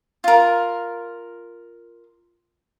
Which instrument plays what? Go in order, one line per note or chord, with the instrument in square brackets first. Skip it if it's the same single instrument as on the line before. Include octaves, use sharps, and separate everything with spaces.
[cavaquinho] F4 A#4